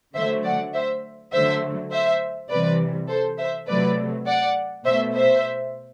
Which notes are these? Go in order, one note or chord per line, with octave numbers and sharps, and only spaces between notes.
D3 F#3 A3 C5 E5
D5 F#5
C5 E5
D3 F#3 A3 C5 E5
C5 E5
C3 E3 G3 B4 D5
A4 C5
C5 E5
C3 F#3 A3 B4 D5
D5 F#5
B2 A3 C5 E5
C5 E5